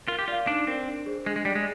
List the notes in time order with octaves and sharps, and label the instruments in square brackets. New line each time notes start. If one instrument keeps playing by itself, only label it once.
[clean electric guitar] F4 [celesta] A#4
[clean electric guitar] G4
[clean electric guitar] F4 [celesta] D5 F5
[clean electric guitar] D4 [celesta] D#4
[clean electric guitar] C4 [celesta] A#4 D5
[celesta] D4
G#4 C5
[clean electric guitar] G#3 [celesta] D4
[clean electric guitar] G#3
[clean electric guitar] G3 [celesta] G#4 D5
[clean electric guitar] G#3